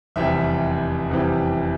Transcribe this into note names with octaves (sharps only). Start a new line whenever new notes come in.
F1 E2 C3 E3 G3 E5
F1 E2 C3 E3 G3